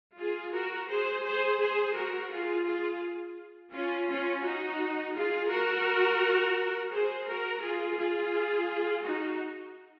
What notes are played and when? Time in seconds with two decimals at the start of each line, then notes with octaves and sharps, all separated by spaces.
0.20 F4 G#4
0.54 F#4 A#4
0.90 G#4 C5
1.26 G#4 C5
1.61 G#4 C5
1.96 F#4 A#4
2.32 F4 G#4
2.67 F4 G#4
3.74 C#4 F4
4.09 C#4 F4
4.44 D#4 F#4
5.15 F4 G#4
5.51 F#4 A#4
6.92 G#4 C5
7.29 F#4 A#4
7.63 F4 G#4
7.99 F4 G#4
9.05 D#4 F#4